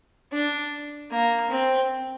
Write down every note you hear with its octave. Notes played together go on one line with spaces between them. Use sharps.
D4
A#3
C4